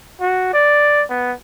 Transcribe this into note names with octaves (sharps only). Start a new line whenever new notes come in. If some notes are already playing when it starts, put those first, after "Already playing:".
F#4
D5
B3